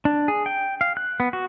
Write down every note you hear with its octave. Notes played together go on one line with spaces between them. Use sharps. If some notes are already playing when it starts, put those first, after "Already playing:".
D4
G#4
G5
F5
F#6
B3
F#4